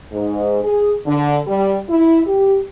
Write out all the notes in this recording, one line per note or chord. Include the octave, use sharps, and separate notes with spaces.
G#2
G#4
D3
G3
E4
G4